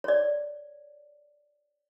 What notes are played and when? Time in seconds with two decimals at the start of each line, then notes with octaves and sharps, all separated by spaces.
0.04 C#5 D5